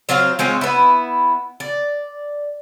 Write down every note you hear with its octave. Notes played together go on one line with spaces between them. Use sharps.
F#3 C4 F4 F5
G#3 C4 C#4 F4
B3 E4
D5